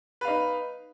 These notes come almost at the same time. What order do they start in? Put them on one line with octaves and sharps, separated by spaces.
B4 F5 D#4